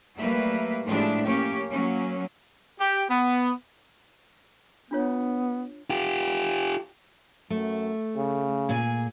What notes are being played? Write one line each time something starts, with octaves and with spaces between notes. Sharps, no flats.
F#3 G3 A3 A#3 B4 E5
A2 F3 G#3 D4 E4 G4
A#3 C#4 G4
F#3 A#3 C#4
G4
B3
B3 D4 F4 C#5
F4 G4
F#2 A3
C#3
A#2 G#4 G#5